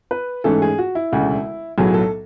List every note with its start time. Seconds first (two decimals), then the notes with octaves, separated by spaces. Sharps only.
0.11 B4
0.44 G#2 E3 A3 C#4 A4
0.62 G#4
0.78 F#4
0.95 E4
1.12 E1 D2 C#3
1.78 B1 A2 F#3 B3 G#4
1.94 A4